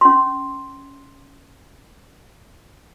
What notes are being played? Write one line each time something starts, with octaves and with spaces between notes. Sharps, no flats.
C#4 C6